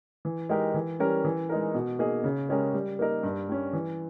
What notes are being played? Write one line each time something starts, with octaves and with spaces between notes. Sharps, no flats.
E3
G#3 D#4 G4 A#4
E3
G3 C#4 G4 A#4
E3
G#3 D#4 A#4
B2
A#3 D#4 G#4
C#3
G#3 C#4 G4 A#4
G3
A#3 D#4 A#4
G2
G3 C#4
E3